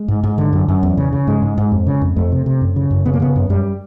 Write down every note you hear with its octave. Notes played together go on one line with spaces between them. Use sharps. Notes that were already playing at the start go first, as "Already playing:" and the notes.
Already playing: G#3
G#2
G#2
D3
F#2
F#2
E2
C#3
C#3
G#2 G#3
G#2
G#2
F2
C#3
F2
F2 A3
C3
C3
F#2
C#3
F#2
C#3 B3
A#3
C#3 B3
F#2
F#2 G3